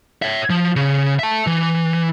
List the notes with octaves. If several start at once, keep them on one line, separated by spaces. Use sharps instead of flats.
C#5 E5
F3
C#3
E5 A5
E3